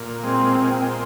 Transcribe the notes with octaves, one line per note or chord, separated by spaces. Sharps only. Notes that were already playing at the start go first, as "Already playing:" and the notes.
Already playing: A#2
G#3 C4
A#2
C4